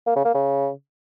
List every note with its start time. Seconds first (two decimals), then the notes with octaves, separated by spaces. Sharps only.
0.07 A#3
0.16 C#3
0.25 A#3
0.34 C#3